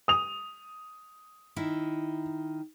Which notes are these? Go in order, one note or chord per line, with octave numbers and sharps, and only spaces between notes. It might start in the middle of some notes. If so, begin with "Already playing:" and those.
D#6 F7
D#3 E4